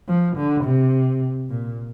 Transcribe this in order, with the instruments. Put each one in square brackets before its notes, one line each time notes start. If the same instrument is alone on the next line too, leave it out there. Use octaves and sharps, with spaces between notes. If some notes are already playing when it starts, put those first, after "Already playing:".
[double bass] F3
D3
C3
A#2